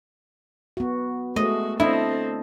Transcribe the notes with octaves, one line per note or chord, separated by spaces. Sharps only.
B3 F#4
G#3 A3 F#4 D#5
C4 D4 E4 A4 D#5